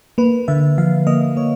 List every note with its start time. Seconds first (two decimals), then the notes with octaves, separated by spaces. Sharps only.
0.18 A#3 B4
0.48 D3 E5
0.78 F3 F5
1.07 A#3 D#5
1.36 A#3 C#5